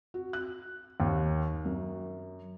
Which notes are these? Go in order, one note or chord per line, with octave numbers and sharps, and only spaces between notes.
F#4
F#6
D#2
F#2